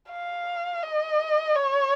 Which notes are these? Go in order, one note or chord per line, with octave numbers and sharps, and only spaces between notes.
F5
D#5
C#5